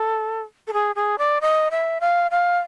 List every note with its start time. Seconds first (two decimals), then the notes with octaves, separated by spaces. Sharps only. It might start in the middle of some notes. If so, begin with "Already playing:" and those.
Already playing: A4
0.67 A4
0.73 G#4
0.96 G#4
1.18 D5
1.41 D#5
1.71 E5
2.01 F5
2.31 F5